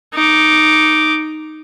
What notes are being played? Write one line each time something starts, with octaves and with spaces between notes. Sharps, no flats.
D#4 D6